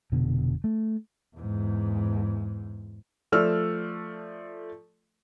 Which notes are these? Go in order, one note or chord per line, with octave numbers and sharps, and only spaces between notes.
F1 B2 D3
A3
E2 G#2
F3 A3 D5 E6 F6